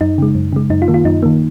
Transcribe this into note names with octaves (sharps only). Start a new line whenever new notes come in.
F#2 D#4
C#3 G#3
F#2
C#3 G#3
F#2 D#4
F4
D#3 A#3
F4
F#2 D#4
D#3 A#3